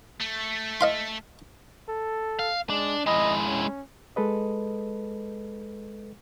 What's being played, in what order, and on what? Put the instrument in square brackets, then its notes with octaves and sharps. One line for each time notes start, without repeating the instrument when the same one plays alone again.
[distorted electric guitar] A3
[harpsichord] D#5 F5 C6
[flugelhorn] A4
[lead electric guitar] F5
[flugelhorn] G#3 [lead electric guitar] D4
[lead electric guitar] G#3 E4 [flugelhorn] D#5
[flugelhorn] C#4
[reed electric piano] G#3 A4 B4 D#5